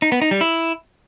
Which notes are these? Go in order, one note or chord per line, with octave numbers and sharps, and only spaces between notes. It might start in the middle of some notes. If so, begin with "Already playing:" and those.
D#4
B3
D#4
G3
E4